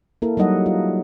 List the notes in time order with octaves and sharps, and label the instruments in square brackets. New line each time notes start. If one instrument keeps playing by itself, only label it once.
[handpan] A#3 E4 A4 A#4
F#3 G3 D#4 D#5 F#5
F4